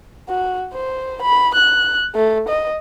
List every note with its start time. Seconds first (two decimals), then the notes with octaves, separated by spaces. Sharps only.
0.29 F#4
0.73 C5
1.22 B5
1.55 F#6
2.15 A3
2.49 D#5